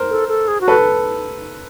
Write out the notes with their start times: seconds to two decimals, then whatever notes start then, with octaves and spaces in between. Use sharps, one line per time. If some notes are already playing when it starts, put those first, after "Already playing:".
Already playing: A#4 C5
0.10 A4
0.29 A4
0.48 G#4
0.61 F#4
0.68 A4 B4